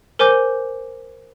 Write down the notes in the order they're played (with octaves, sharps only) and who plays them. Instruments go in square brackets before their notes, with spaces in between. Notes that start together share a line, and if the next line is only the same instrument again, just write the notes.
[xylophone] A#4 C5 G#5 D6 G6